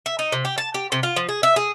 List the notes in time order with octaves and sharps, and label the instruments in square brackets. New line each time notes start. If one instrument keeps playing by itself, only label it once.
[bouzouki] E5
D#4
C3
G4
A5
G4
C3
F4
F3
G#4
E5
G#4